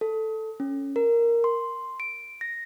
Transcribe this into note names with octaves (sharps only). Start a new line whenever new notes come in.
A4
C#4
A#4
C6
D7
A#6